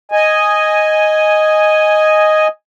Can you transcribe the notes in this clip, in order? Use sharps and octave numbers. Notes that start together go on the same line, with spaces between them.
D#5 G#5